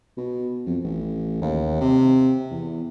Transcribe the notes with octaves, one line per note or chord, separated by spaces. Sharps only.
B2
F2
A1
D#2
C3
E2